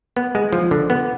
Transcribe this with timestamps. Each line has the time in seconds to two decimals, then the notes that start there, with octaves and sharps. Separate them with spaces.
0.17 B3
0.35 G#3
0.53 F3
0.71 D3
0.90 B3